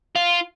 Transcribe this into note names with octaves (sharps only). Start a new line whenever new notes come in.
F4